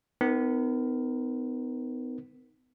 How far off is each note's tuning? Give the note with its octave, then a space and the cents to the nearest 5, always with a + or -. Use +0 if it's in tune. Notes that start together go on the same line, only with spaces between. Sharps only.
B3 +40 D#4 +0 A#4 +0